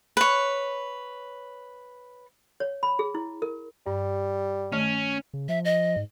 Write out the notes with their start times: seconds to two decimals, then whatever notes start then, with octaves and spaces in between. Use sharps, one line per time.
0.17 B4 C#5
2.60 C#5
2.83 B5
2.99 G#4
3.15 E4
3.42 A#4
3.87 G2 G3
4.72 D#3 A3 C#4 F6
5.33 C#3
5.49 F3 E5
5.65 D#5
5.96 G#2